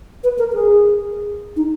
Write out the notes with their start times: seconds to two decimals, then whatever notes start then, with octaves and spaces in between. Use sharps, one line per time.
0.24 B4
0.39 A#4
0.53 G#4
1.56 D#4